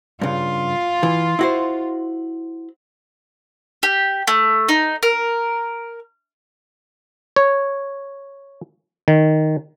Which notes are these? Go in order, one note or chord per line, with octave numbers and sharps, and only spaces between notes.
G2 C#3 F4
E3
E4 F#4 C5
G4
A3
D#4
A#4
C#5
D#3